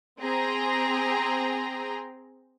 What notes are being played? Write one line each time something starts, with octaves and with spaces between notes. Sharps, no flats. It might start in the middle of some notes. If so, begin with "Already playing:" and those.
C4 G#4 G5 A#5 C6